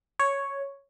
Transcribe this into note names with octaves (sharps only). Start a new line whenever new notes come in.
C#5